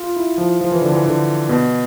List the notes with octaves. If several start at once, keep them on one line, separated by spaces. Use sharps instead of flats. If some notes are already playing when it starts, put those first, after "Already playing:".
Already playing: F4
E4
F3
F3
E3
D3
E3
D3
B2